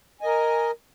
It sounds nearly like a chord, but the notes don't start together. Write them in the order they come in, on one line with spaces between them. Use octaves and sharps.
G#5 D#5 A#4